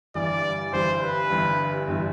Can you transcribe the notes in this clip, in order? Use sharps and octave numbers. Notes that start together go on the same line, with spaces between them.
G1 G2 E3 G3 D5
G1 G2 E3 G3 C5
B4
G1 G2 E3 G3
G1 G2 E3 G3